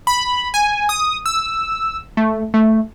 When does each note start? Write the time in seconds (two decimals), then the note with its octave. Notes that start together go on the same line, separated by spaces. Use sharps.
0.07 B5
0.54 G#5
0.89 D#6
1.26 E6
2.17 A3
2.54 A3